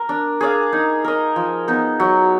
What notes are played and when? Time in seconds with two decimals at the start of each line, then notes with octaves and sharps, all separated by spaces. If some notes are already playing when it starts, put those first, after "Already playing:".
Already playing: A#4
0.09 D4
0.41 G#4 D5 F5
0.73 D#4
1.04 A#4 D#5
1.36 F3
1.68 B3 D#4
2.00 F#3